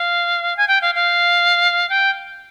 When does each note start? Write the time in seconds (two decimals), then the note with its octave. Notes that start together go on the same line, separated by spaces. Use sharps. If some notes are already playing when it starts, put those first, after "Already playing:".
Already playing: F5
0.57 G#5
0.68 G5
0.81 F5
0.95 F5
1.89 G5